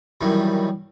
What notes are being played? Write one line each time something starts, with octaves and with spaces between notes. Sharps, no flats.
F#2 D#3 E3 G3